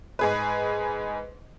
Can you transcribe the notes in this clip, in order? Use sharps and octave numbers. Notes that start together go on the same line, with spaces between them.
G#2 G#4 B4